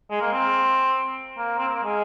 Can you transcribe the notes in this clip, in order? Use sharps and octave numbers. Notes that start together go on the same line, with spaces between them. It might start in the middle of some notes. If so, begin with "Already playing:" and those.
G#3
A#3
C4
A#3
C4
A#3
G#3